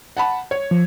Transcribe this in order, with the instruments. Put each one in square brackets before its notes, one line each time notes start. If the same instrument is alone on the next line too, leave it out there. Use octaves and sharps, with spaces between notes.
[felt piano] F#5 A5 B5
C#5
[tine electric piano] F3